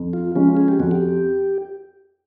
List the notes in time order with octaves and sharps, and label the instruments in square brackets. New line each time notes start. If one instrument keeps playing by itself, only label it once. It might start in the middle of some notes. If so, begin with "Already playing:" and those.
Already playing: [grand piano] F2
[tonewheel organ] F4
[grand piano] C#3 F3 G#3 C#4 [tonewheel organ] F4
[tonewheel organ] G#4
G4
[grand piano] F2 [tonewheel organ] F#4
[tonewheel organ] G4